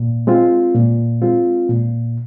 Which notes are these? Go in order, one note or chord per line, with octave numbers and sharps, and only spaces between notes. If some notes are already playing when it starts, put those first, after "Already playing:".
Already playing: A#2
G#3 C4 F4
A#2
G#3 C4 F4
A#2